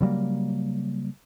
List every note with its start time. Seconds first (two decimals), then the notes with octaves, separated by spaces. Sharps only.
0.01 C#3 F#3 G3 A#3